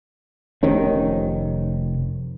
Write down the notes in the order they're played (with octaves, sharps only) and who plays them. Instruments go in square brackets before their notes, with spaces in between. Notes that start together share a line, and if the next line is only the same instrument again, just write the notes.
[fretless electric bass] F1 C3 D#3 C#4